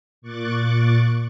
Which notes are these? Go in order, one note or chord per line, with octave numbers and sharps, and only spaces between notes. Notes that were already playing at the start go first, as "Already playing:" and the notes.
A#2 C#6 D6 F#6 A6